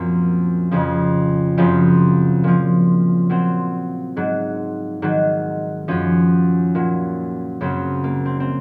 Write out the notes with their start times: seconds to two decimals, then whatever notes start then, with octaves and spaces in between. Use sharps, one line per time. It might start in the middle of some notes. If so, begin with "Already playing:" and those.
Already playing: F#2 A#2 F3 A#3 C4
0.71 F2 C#3 F3
1.57 F#2 C#3 F3 C4
2.44 A#2 F3
3.30 A#2 F#3 C4
4.16 G#2 F#3
5.02 G#2 D#3 F#3
5.88 F#2 F3 C#4
6.75 A#2 F#3
7.61 F#2 C#3 F#3 C4
8.04 A#3
8.25 C4
8.40 C4